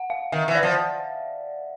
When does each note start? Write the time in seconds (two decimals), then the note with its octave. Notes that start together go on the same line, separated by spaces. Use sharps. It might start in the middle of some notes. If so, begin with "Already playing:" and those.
Already playing: F#5
0.10 F5
0.32 D#3 E5
0.48 E3
0.55 D5
0.63 F3